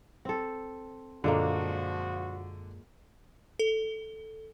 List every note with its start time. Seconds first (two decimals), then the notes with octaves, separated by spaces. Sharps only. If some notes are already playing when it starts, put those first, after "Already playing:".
0.25 C4 A4
1.24 F#2 A#2 D3 F3 G#3 A#3 D4 F#4
3.59 A4